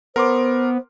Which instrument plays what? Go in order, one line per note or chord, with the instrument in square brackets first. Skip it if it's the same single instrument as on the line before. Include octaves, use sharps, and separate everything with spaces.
[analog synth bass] B3 [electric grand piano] A#4 C6 D6 [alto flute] C5